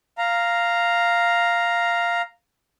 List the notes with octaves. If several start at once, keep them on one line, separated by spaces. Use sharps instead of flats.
F5 A#5